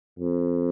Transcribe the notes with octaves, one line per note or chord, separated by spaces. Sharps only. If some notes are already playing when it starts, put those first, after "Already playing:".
F2